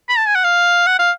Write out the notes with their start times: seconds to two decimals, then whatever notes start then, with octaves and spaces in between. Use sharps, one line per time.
0.09 B5
0.18 A5
0.27 G#5
0.35 F#5
0.44 F5
0.87 F#5
0.99 F5